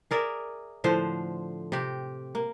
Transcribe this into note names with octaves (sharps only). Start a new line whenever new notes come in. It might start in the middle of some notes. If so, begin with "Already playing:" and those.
G#4 A#4 D5 E5
A2 D3 F3 C5
C3 G4
A#3